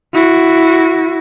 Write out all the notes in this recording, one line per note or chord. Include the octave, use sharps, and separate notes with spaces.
E4 F#4